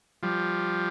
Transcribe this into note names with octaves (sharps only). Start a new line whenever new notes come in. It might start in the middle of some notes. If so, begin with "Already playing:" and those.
F3 G3